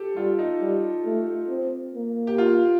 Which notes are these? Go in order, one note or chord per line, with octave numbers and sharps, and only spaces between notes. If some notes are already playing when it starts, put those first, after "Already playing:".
Already playing: G4 A4
G3 F4
D#4
G3
A3
C4
A#3
G4
F4